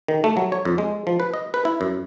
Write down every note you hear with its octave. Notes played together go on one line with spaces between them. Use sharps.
D#3
A3
F#3
C#5
F2
G#3
F3
B4
D#5
B4
E4
F#2